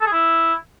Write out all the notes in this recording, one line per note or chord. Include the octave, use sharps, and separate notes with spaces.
A4
G#4
E4